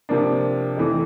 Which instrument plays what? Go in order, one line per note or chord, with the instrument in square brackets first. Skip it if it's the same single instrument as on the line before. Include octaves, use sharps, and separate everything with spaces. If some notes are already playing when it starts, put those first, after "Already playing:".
[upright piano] C3 F3 A#3 D4
F2 E3 A3